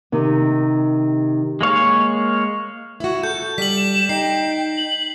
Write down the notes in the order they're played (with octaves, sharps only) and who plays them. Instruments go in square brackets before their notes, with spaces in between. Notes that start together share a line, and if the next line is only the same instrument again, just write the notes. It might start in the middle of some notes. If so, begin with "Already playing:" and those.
[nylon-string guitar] C3 D#3
[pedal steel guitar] G#3 A#3 C#5 F5
[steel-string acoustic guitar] E4 F#4
[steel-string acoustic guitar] A4 [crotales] G6
[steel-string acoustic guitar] G3 [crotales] B6 F#7
[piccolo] E7
[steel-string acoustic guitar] D#4 [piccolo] G5 [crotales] C7
[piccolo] F#7